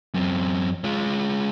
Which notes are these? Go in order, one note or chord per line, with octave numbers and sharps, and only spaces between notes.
F#2 C4
G#3 F4